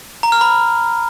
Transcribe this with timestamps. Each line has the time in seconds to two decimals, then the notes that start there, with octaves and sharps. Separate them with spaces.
0.23 A#5
0.32 F6
0.41 B5